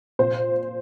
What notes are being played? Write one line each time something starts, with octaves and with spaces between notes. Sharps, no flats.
A#2 C5